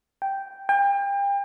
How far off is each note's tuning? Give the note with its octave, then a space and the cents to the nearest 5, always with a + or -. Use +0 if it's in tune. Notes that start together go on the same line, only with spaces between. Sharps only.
G5 -5
G5 +35